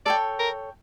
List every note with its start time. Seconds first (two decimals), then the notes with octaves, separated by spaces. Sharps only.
0.05 A4 C#5 D5 G5
0.39 A#4